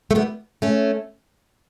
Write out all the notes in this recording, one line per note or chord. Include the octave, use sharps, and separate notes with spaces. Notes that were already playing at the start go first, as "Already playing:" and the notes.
A3
G3 B3
A3 C#4